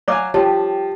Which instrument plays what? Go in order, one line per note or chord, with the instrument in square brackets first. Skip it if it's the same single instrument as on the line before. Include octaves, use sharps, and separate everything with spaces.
[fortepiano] F#3 F5 G#5 [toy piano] C#5 D5 D6
[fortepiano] F3 [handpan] G4 [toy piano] C#5 [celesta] G5 A5